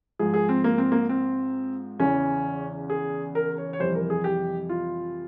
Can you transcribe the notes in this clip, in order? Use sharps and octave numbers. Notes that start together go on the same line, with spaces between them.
G#2 F3 G#4
G#4
C4
A#3
C4
A#3
C4
E2 C#3 E3 C#4
G#4
A#4
C#5
C#5
F2 C3 E3 G3 C5
A#4
G#4
G4
F4